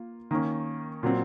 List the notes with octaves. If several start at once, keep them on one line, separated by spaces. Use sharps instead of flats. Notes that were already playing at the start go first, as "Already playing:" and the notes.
Already playing: A#3 F4
D#3 A#3 C#4
A#2 F#3 C4